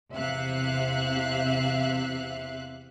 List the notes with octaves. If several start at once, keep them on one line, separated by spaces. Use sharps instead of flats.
E2 C3 E5 F5 F#6